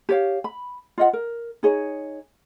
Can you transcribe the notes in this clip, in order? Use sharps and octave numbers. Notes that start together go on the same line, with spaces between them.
G4 C#5 F5
B5
F4 D#5 F#5
A#4
D#4 G#4 C#5